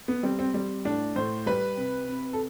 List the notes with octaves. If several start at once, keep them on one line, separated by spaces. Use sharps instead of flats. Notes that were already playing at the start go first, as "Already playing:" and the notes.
B3
G3 C4
C4
G3 C4
A2 D4
A2 C5
G3 B4
C3
C3
A4